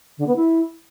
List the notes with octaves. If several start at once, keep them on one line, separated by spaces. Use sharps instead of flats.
D3
B3
E4